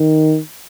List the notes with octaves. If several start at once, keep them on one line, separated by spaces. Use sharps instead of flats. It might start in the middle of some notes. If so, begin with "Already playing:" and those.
Already playing: D#3